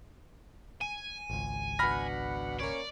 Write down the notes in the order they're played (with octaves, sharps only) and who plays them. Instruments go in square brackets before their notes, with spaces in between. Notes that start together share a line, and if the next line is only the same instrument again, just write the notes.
[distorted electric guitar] G#5 [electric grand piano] D#7
[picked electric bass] G#1 C#2
[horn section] B2 D4 F#5 [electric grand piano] B5 F6 A#6
[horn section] A#3 C#4 C#5 [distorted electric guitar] D5